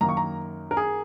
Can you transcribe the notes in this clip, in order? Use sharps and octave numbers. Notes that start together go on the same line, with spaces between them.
F#2 D#3 A#3 A#5
C#6
A#5
A#4
G#4